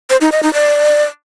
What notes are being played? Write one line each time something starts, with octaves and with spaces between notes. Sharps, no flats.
C5
D#4
D#5
D#4
D5